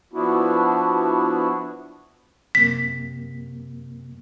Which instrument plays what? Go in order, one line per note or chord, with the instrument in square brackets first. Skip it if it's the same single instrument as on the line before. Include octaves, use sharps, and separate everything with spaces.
[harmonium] F3 B3 D4 E4 F#4
[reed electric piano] F#2 C3 A#3 [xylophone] B6